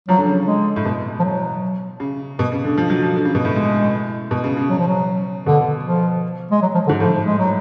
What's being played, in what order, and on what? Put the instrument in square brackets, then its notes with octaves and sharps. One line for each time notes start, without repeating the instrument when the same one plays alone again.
[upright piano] F3 [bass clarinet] F#3
[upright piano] D3
C#3
[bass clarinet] G#3
[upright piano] A2
B2
[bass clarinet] F3
F#3
[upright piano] C#3
B2
C#3
D3
F3
F#3
F3
D3
C#3
B2
A2
[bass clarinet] G#3
[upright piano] B2
C#3
C#3
[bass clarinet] F#3
F3
F#3
[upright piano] B2 [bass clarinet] D3
[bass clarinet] F3
G#3
F#3
F3
D3
[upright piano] G#2
[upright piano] A2 [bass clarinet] F3
[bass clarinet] G#3
F#3